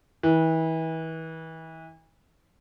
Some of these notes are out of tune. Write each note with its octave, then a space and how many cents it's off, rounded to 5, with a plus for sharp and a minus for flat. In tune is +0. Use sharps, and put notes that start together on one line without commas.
E3 -35